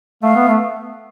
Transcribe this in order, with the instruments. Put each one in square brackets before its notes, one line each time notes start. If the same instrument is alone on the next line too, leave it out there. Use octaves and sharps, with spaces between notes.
[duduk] A3 [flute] F5
[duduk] B3
A3